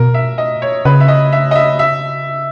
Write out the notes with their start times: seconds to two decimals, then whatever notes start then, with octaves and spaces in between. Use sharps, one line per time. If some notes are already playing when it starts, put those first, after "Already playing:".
Already playing: B2 A#4
0.14 E5
0.38 D#5
0.62 C#5
0.85 C#3 B4
1.00 E5
1.08 D#5
1.32 E5
1.51 D#5
1.55 E5
1.79 E5